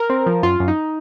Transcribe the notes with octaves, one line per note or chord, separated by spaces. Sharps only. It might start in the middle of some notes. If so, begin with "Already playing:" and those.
Already playing: A#4
C4
F3
F#2 F4
F#2
D#4